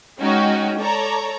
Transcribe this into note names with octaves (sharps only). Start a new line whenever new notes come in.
G#3 C#4 D#4 F#4 G5
A4 C#5 D5 A#5